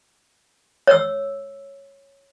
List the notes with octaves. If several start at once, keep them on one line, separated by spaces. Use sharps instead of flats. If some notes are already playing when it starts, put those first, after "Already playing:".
C#5 E6